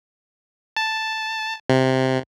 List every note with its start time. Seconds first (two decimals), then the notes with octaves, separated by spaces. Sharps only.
0.76 A5
1.70 C3